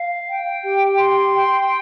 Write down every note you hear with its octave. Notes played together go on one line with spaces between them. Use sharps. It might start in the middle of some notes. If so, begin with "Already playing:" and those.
Already playing: F5
G5
G4
C6
G5